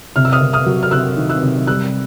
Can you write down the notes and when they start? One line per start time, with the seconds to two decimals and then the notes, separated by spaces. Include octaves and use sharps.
0.16 C3 F6
0.25 E6
0.32 D#6 F6
0.41 C3
0.53 D#6 F6
0.66 F#3
0.83 F6
0.91 C3 E6 F#6
1.17 D#3
1.29 E6 F#6
1.43 C3
1.67 G3 E6 F#6